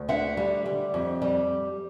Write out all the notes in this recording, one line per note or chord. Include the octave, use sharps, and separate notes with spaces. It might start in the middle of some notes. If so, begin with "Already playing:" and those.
Already playing: D2
D3 E5 F#5
G3
G3
F2
G3